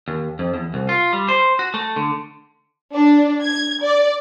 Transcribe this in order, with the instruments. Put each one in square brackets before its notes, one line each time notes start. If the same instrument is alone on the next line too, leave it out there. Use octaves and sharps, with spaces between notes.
[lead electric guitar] D#2
F2
E2
C2
F4
G3
C5
F#4
A3
D3
[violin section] D4
G#6
D5